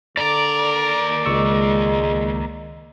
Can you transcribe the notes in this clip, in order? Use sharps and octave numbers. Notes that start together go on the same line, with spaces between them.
D#2 D3 A#4 D5
C#2 G#3 C#6 E6